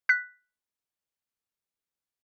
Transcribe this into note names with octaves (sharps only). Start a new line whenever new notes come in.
F#6 B6